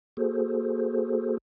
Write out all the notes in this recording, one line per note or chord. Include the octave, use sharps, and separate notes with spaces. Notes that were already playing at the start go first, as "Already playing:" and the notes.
A#3 F#4 G#4 A4 C5